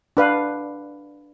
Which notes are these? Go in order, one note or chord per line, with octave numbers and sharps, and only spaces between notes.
D4 B4 F5